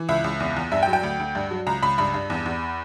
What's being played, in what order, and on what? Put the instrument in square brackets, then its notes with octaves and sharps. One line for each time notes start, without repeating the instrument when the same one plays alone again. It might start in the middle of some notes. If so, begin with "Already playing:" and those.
Already playing: [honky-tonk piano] E3
C#2 E5
C#2
E2
E2
G2 E5
G5
F#3
G5
D2
D2
G2
F#3
C#2 A#5
C#2 B5
G2 B5
G2
E2
E2